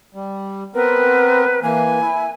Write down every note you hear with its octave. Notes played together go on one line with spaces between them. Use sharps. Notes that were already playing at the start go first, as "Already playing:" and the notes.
G3
B3 C4 A#4 B4
E3 A#3 G#5
E4